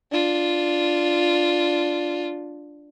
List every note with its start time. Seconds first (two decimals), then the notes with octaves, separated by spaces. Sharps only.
0.12 D4 F4